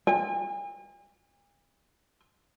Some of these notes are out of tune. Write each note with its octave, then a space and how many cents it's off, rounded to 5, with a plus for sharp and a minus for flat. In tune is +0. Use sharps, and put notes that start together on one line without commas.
G#5 -40